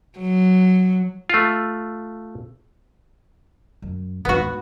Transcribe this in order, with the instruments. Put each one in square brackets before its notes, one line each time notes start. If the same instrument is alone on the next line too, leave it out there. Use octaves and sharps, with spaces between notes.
[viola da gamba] F#3
[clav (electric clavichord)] A3 F4
[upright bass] F#2
[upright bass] D#2 G#2 [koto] B3 F#4